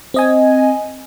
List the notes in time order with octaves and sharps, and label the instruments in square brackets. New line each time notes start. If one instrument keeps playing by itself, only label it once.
[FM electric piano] C4 D#5 G#5